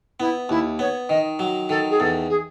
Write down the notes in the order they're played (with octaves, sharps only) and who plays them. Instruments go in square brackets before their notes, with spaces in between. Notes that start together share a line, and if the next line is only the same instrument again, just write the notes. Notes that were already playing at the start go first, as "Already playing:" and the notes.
[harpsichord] B3 [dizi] E4
[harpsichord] D#2 [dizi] E4
[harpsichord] B3 [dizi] C#5
[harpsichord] D#3 [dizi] D#5
[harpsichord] F#3
[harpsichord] D#3 [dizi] A4
[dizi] G#4
[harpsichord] E2 [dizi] A4
[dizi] G#4